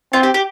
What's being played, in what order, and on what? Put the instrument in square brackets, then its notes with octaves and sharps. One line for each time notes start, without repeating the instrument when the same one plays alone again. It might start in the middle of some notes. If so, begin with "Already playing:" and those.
[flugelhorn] C4 [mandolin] F4
[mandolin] G4
G4